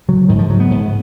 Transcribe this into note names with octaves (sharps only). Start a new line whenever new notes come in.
C#3 F#3
G#2 D#3
F3
G#2 F#3
B3
G#2